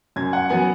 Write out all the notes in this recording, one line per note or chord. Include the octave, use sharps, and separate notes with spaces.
F#2 G#6
F#5
F#3 B3 G#5